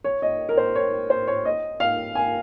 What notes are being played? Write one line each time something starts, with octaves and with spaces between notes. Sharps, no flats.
C#5
D#5
A#4
C5
C#5
C5
C#5
D#5
F5
G#5